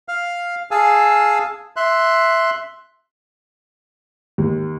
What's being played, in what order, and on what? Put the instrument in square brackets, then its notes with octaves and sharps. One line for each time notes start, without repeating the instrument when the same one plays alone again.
[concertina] F5 F6
G#4 F5 G#5 A5 E6
E5 C6 F#6
[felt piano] D#2